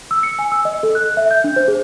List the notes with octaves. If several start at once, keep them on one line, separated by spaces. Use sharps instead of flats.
E6
C#7
G#5
E6
D#5
A4
F#6
E5
G6
D4
C5
G#4